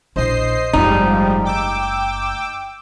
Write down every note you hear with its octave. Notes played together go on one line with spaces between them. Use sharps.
A#1 E4 C5 D#5 C7
F#1 G#2 F3 G3 A3 D#4
G5 D6 E6